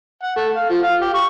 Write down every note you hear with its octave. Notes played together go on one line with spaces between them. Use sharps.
F#5
A3
F5
F3
F5
G4
C#6